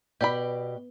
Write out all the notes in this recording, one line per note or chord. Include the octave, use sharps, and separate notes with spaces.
B2 G4 D5 B5